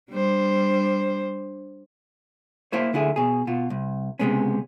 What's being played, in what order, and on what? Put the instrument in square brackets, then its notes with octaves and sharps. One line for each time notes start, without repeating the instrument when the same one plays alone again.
[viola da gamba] G3 D4 C5
[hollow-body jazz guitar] A#3 E4 C5 C#5
D2 D3 E4 G#4 E5
B2 G#4
B2 F4
C2
C#2 F#2 C3 G#3 B3 C#4